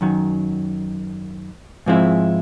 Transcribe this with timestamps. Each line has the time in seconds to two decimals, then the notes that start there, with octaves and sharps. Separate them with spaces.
0.01 F#2 D#3 F#3
1.86 G#2 F3 G#3 C4 E4